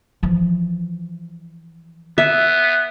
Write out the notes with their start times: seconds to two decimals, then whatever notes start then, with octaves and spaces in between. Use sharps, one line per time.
0.23 E3 F3
2.18 B3 E5